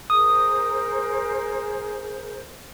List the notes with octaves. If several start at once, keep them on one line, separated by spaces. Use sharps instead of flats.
G#4 A#4 C5 D#6